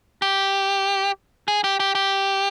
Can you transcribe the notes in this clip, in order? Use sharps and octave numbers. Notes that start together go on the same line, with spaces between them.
G4
G#4
G4
G4
G4